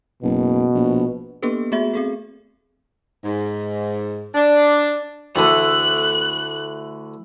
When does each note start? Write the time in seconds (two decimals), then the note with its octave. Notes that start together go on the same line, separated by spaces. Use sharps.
0.23 F#1 B2
0.74 A#1
1.43 A#3 B3 D4 G4 A4 B4
1.72 A3 B3 F#4 G#4 E5
1.93 C4 G#4 A4
3.24 G#2
4.35 D4
5.36 D2 D3 A3 E4 F#6